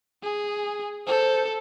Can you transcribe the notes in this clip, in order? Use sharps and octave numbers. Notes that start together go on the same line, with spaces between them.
G#4
A4 C5